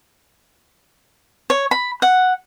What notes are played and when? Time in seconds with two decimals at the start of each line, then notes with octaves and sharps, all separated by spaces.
1.50 C#5
1.71 B5
2.02 F#5